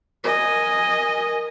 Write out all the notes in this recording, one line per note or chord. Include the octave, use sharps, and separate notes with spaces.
A#4 D#5 G#5